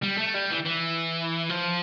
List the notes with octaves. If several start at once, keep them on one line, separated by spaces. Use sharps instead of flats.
G3
A3
G3
E3
E3
F3